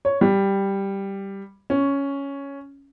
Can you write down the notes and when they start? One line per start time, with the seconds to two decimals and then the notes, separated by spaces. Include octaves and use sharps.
0.05 C#5
0.21 G3
1.70 C#4